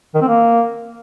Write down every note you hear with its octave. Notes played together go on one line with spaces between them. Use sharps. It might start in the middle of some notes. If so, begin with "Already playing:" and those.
D#3
C4
A#3